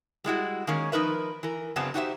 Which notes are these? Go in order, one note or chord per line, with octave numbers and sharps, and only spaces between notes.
G3 G#3 E4 F#4
D#3 G#3 A#3 C#4 C#5
F3 D#4 A#4 B4 E5
E3 A#4
F#2 C#3 F#3 B3 C4 D4
D#4 F#4 G4 C5 D#5 E5